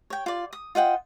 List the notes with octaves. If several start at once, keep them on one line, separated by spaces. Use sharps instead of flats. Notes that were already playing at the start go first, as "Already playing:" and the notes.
C#5 G5
F4 D5
D#6
F4 D#5 F#5 G5